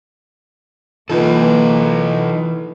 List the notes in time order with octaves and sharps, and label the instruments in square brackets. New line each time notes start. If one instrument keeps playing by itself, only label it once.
[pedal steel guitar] E3 [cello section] A#3 [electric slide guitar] D#4 A4 [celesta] F4 B4